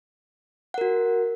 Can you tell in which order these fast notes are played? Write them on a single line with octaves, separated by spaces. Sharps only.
F#5 A#4 F#4